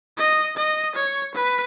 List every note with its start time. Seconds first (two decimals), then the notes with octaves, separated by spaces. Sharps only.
0.18 D#5
0.57 D#5
0.96 C#5
1.35 B4